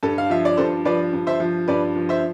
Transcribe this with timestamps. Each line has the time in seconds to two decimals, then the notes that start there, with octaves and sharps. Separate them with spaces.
0.03 G2 A4
0.18 F5
0.30 F3 E5
0.45 D5
0.57 G2 A4 C5
0.85 F3 B4 D5
1.13 G2
1.27 C5 E5
1.40 F3
1.68 G2 B4 D5
1.96 F3
2.09 C5 E5